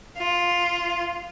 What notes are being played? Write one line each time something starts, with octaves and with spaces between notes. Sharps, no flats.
F4